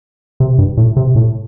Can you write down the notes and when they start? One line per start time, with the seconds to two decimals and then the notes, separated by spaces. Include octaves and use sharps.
0.40 C3
0.58 G2
0.77 A2
0.96 C3
1.15 A2